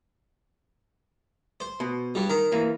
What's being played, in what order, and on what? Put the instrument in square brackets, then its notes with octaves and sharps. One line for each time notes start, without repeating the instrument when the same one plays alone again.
[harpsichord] C5
[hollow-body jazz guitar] B2
[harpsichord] G2 G3
[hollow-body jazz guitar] D#3 [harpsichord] A#4
[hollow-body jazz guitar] E3 A#3